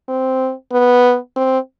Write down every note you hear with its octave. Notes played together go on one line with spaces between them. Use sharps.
C4
B3
C4